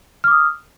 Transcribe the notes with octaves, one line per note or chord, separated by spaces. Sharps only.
D6 D#6 F6